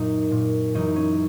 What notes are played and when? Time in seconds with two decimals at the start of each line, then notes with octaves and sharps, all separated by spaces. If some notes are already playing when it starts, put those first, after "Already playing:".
Already playing: F#2 A#2 D#4
0.31 A#2
0.74 F#2 E3 D#4
0.96 C#4